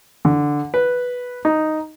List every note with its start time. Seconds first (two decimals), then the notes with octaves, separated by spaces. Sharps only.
0.25 D3
0.74 B4
1.45 D#4